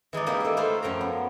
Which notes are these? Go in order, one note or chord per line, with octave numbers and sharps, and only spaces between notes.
E3 G#3 D#4 D5
A#3 D#4 E4 G4
G#4 A4
A3 E4 F4 C5
F#2 F3 G5 A#5
B3